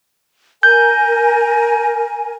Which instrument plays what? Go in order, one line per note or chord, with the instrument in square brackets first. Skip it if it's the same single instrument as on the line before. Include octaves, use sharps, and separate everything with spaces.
[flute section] A#4 G#5 [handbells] G6